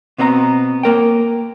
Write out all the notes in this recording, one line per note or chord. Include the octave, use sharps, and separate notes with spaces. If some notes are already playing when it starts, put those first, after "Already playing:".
B2 B3 C4 D#5 A#5
A#3 A#4 G5